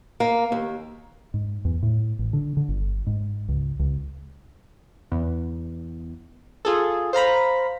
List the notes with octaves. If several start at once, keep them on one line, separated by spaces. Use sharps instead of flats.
A#3
D#2
G#2
E2
A2
A1
D3
D3
G1
G#2
C#2
C#2
E2
F4 G#4 A4
C5 F5 A#5 B5